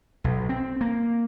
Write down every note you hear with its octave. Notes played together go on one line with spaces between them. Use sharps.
B1
C4
A#3